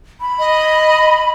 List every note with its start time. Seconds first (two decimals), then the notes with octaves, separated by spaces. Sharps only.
0.21 B5
0.39 D#5